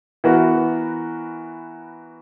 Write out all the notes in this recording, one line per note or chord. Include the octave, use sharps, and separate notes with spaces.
E3 B3 F#4 A#4